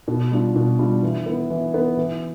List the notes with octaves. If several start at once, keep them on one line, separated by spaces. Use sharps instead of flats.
B2
G3 D4 F4
B2
G3 D4 F4
E3
B3 E4
E3
B3 E4
E3